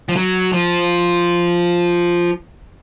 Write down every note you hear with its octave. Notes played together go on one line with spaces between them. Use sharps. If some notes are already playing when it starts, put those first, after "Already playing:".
F3
F#3
F3